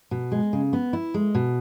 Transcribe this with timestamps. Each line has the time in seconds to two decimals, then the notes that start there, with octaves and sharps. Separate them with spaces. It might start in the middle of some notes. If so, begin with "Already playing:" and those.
0.11 B2
0.32 G#3
0.53 C#3
0.73 B3
0.93 E4
1.14 G#3
1.35 B2